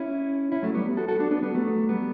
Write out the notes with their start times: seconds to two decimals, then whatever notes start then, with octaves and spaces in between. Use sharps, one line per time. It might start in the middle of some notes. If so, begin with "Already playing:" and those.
Already playing: C#4 E4
0.52 C#4 E4
0.63 F#3 A3
0.74 G3 B3
0.97 F#4 A4
1.08 F#4 A4
1.20 D4 F#4
1.31 B3 D4
1.42 G3 B3
1.54 F#3 A3
1.89 G3 B3